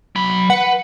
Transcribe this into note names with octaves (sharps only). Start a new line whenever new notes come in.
F#3 B5
B4 F#5